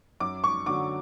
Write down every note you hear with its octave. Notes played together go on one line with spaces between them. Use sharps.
F#2 D6
C#6
D3 F#3 D6